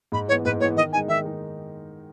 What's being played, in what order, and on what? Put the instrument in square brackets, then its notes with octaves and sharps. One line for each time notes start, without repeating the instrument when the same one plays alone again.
[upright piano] G#2 [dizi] B5
[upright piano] E3 [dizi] C#5
[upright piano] B3
[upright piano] G#2 [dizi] B4
[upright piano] E3 B3 [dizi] C#5
[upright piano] D#3 [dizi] D#5
[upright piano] D#4 [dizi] G#5
[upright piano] G#3
[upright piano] D#3 [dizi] E5
[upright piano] G#3 D#4